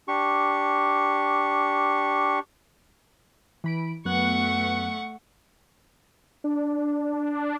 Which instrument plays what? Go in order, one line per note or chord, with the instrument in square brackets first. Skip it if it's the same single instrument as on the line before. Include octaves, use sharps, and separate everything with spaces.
[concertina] D4 G4 C#6
[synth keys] E3 B5 D7
[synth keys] F#2 B3 F#6 [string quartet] A3 F#5 C#6
[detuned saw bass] D4